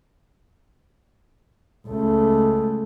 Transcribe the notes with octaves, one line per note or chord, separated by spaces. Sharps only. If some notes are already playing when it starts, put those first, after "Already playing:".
C#2 A3